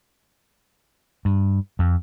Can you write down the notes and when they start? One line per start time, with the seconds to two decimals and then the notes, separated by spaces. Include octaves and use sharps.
1.25 G2
1.79 F2